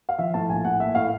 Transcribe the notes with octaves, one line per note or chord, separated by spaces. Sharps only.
F5
F3 E5
A2 A5
A#1 G#5
A2 F#5
A#3 E5
A2 F5